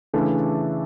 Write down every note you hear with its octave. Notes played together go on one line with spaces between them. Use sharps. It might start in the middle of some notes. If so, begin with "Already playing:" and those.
C#3 E3 A3 D4 A4